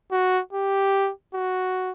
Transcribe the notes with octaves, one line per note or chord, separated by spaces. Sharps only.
F#4
G4
F#4